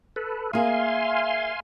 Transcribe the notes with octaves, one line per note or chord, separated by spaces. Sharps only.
A4 B4
A#3 G#4 E5 F5 G#5 C6